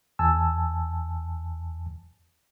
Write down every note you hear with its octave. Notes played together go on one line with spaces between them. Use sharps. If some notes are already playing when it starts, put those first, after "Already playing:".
E2 G#5 A5 E6